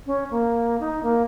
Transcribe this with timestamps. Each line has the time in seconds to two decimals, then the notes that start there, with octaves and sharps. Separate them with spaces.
0.06 C#4
0.31 A#3
0.80 D#4
1.03 A#3